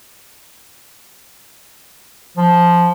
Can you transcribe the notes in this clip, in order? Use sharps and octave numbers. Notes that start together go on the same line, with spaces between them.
F3